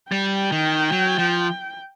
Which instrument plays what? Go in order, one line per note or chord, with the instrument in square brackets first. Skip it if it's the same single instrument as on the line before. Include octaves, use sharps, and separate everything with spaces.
[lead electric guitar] G3 [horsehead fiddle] G5
[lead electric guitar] D#3
F#3
F3